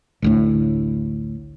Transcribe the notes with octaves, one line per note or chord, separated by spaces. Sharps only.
A1 D2 A2